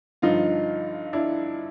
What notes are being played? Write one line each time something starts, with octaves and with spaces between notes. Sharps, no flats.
G2 D3 F3 D#4 F4
D4 E4